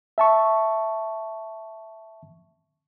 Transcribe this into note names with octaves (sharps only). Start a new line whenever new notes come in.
E5 A5 C#6